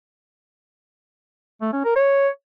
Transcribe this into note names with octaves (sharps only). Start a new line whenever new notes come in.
A3
C#4
A#4
C#5